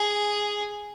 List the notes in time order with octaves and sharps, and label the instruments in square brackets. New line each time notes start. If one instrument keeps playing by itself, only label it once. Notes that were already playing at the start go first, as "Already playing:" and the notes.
Already playing: [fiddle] G#4